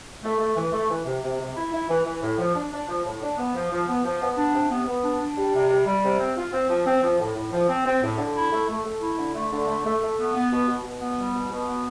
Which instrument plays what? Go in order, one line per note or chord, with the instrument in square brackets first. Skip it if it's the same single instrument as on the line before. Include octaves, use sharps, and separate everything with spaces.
[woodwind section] A3
A3
E3
A3
E3
C3
C3
C3
E4
E4
E3
E3
A2
F3
D4
D4
F3
A2
D4
B3
F3
F3
B3
F3
B3
D4
C3
B3
B3
D4
D4
G3
C3
G3
G3
C3
C4
F4
C4
F3
C4
F3
A2
A2
F3
C4
C4
A2
D3
E4
A3
A3
A3
E4
D3
A3
D3
A3
A3
A3
B3
B3
B2
B2
B2
B3
G3
B2
B2
B3